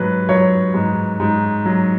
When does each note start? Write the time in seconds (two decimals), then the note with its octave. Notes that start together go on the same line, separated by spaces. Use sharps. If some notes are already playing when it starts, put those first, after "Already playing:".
Already playing: G#2 F#3 B4
0.29 F#3 C#5
0.74 G#2
1.20 G#2
1.65 F#3